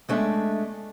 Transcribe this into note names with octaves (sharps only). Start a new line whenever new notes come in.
G#3 A3 D4 E5